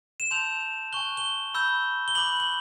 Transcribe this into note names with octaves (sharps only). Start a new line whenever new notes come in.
E7
A5 C6 E6 G6 F7
G#5 C#6 F#6 G7
G7
B5 E6 G6
G7
B5 D6 F#6 F#7
F#7